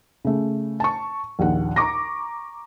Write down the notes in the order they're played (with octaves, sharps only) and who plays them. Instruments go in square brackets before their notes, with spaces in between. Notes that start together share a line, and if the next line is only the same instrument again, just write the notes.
[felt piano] C#3 A3
A5 C#6
A#1 D#2 F#5
A#5 C#6 D6 A#6